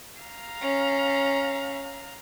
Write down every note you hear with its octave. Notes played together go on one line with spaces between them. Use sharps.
F5 A#5
C#4